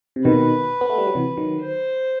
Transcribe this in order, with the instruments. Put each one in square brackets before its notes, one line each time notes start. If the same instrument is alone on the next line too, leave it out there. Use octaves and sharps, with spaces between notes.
[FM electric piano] C3
[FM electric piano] B2 D#3 [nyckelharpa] B4
[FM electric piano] B3
A3
G3
F#3
C3 E3
D#3 F#3
[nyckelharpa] C5